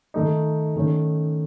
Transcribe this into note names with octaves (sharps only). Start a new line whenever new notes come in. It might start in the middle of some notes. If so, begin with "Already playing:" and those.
D#3 A3 D#4
D#3 A3 C#4